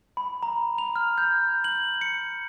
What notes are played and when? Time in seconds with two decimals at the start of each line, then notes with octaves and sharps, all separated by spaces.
0.17 B5
0.43 A#5
0.78 F7
0.96 F6
1.18 G6
1.64 F#7
2.01 C#7